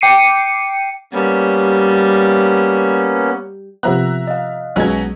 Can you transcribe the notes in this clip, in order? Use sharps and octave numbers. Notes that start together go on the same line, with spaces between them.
G5 D6 C7 C#7 D#7
G3 A#3 B3 C#4
C3 F3 B3 E5 A#5 F#6
D#5 F5
B1 B2 F#3 G#3 C#4 G#6